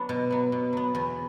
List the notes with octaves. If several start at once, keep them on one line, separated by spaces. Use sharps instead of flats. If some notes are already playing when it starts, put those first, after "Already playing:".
Already playing: F#3 B3 D4
B2
F#3 B3
B2
F#3 B3
E2